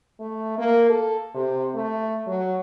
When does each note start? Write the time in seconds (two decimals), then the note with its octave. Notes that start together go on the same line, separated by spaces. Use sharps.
0.20 A3
0.58 A#3
0.89 A4
1.35 C3
1.75 A3
2.27 F#3